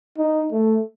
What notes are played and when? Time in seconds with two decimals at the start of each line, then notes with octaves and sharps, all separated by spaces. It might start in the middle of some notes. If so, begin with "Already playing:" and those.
0.18 D#4
0.52 A3